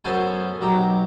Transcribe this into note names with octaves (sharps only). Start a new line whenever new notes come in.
F#2 B3 C#4 A4 C5 G#5
B1 F#3 G4 A#5